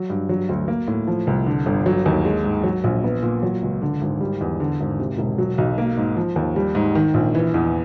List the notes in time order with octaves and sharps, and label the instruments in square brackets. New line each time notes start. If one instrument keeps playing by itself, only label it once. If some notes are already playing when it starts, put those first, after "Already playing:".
Already playing: [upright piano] F#3
G2
F#3
D2
A#3
A2
F3
C2
D3
G1
F#3
D#2
G#3
G#2
F#3
A#1
B3
A#2
F#3
C#2
D3
G#1
G3
E2
D3
G#1
C3
E1
F#3
B1
A#3
G#2
F3
D#2
G3
G#2
D#3
A#1
E3
E2